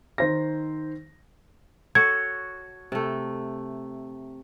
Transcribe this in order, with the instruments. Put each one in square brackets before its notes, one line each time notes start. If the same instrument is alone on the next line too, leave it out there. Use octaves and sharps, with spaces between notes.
[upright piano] D#3 C5 A#6
[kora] F#4 A4 C#5 [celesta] G#6
[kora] C3 A3